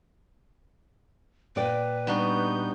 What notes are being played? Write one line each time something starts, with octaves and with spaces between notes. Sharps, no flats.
A#2 B4 D5 G5
G3 B3 D4 D#4 F#4 G6